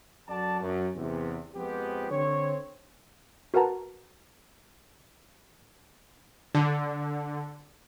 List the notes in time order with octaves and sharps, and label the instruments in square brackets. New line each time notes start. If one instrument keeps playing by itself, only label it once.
[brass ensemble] F#2 F#3 F#4 A4 D5 A5
F#2
E2 C3
F2 F3 G#3 B3 C4 G4
D3 C4 C#5
[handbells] F#4 A#4 B4 F#5 A5 A#5
[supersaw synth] D3